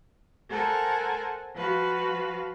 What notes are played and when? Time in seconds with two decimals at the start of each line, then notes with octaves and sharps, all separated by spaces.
0.49 A4 A#4 C5 F#5 G#5 A#5
1.54 F3 F#4 B4 F5